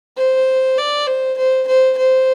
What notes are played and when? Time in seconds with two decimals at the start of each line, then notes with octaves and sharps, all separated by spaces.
0.17 C5
0.78 D5
1.07 C5
1.37 C5
1.68 C5
1.98 C5